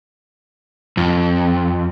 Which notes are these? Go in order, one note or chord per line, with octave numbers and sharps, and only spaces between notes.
F2